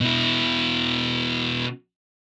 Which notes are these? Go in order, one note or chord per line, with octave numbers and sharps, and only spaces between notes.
B2 E4